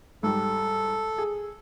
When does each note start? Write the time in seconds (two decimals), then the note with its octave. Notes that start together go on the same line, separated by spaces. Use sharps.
0.23 G#2 G3 A4
1.18 G#4